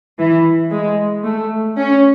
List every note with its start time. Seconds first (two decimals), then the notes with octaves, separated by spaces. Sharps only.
0.17 E3
0.71 G#3
1.24 A3
1.78 C#4